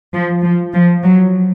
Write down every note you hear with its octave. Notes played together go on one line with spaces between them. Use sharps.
F3
F3
F3
F#3